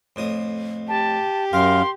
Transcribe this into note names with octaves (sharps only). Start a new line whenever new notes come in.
F2 A2 D#6
G4 A5
F#2 A#4 F5 C6